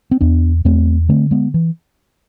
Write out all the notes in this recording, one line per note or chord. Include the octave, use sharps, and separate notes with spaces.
C4
E2 B3 D4
E2 A3 C4
D3 A3 C4
G#3 B3
E3